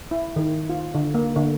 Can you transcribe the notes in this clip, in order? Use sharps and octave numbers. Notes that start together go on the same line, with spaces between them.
E4
D#3
F4
D3
A#3
D3